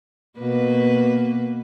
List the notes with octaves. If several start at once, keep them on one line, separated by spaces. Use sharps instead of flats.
B2 A#3 B4